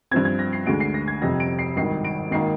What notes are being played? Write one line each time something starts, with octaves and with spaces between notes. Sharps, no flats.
G2 F3 C4 G#6
G#6
A#6
C7
D2 D3 G#3 D7
C7
A#6
G#6
G1 F2 C3 A#6
D7
C7
G#1 G2 D#3 C7
D7
G#1 D#3 A#3 C7